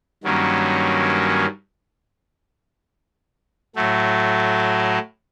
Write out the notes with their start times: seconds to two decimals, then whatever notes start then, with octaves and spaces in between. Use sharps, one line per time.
0.23 G2 D#3 F#3 A#3 C#4
3.75 A2 F#3 A3